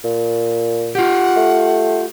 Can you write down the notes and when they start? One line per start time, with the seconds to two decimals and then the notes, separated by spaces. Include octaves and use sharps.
0.04 A#2
0.95 F4 G4 F#5
1.37 A3